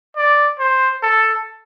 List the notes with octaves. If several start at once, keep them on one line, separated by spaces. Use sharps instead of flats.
D5
C5
A4